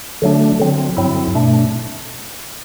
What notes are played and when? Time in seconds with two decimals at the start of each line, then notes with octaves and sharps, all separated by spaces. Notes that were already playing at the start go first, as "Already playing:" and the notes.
0.22 D3 F#3 A3 D4
0.60 D3 F#3 C4
0.97 G2 F#3 C4 E4
1.35 B2 A3 D4